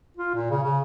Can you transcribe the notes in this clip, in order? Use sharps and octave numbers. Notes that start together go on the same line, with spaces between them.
F4
A#2
C#3
C#3